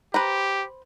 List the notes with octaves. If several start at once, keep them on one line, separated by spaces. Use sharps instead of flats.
G4 B4 C5 A#5